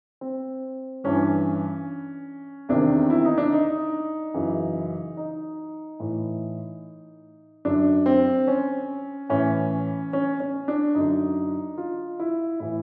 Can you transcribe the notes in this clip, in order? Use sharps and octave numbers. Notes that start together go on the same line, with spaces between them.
C4
G2 E3 C#4
E2 C3 D#3 D4
E4
D#4
D4
D#4
F#2 C#3 E3
D#4
A2 E3
F#2 D3 D4
C4
C#4
A2 E3 C#4
C#4
C#4
D4
F#2 D3 D#4
F4
E4
A2 E3 E4